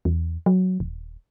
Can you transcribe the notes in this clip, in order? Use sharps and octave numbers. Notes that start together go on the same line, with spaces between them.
E2
F#3
D#1